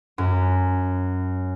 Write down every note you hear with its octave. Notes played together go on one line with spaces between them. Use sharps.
F#2